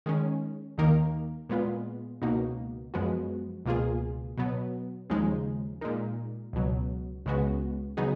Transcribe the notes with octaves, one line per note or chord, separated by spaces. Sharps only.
D#3 G#3 C#4
D#2 D#3 A#3 D#4 A#4
A#2 G#3 B3 F4
C#2 B2 A#3 D#4 F#4
F#2 F3 G#3 B3 F#4
C#2 B2 A#3 F4 G#4
B2 F#3 B3
D#2 C#3 F3 G#3 D#4
A#2 G#3 D#4 A#4
C#2 B2 F#3
C#2 C#3 G#3 B3 F#4
C#3 F#3 B3 D#4 G#4